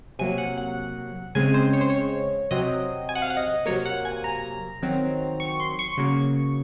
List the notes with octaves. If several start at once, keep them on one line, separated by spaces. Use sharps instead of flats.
C3 F#3 A#3 G#5
F#5
F#5
C#3 G#3 C4 G#5
C5
C#5
C5
C#5
C3 F#3 C4 D#5
G#5
F#5
F5
F#5
D#5
C3 F#3 A#3 C#5
F#5
G#5
A#5
D#3 F#3 C4
C#6
C6
C#6
C#3 F#3 A#3